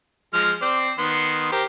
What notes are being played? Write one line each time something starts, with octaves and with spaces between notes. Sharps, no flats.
F3 G#3 F6
C4 C5 D5
D#3 B3 C6
G4 A#4 C5